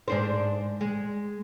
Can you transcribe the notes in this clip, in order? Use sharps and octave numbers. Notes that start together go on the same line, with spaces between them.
G#2 D4 C5
G#3